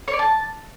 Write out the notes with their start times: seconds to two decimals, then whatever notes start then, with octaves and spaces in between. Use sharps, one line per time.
0.08 C#5
0.13 D5
0.19 A5